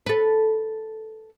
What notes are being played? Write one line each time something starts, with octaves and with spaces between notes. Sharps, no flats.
A4 B4